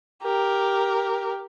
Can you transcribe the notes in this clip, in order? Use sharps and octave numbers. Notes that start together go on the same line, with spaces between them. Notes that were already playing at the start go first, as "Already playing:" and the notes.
G4 A#4